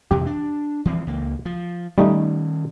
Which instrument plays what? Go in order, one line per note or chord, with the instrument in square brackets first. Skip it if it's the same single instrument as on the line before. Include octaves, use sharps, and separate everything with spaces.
[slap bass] F2 C3 E3 [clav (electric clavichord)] G4
[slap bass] D4
E3 F3 C4
C#2 A#3
F3
[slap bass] D#3 C#4 [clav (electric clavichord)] G3 A3 D#4